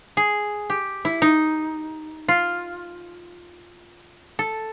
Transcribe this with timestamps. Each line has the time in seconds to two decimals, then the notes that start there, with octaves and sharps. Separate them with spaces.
0.17 G#4
0.70 G4
1.05 E4
1.22 D#4
2.28 F4
4.39 A4